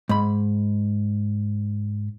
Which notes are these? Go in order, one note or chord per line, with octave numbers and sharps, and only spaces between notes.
G#2 B5